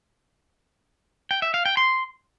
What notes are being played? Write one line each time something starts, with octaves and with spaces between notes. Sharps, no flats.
G5
E5
F5
G5
C6